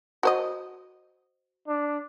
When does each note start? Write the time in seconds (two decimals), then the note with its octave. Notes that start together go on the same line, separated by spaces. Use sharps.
0.23 F#4 C5 D#5
1.68 D4